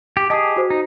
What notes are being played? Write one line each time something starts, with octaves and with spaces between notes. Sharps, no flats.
G4
G4 G#4 D#5 A5 D#6
F#4 C5
D#4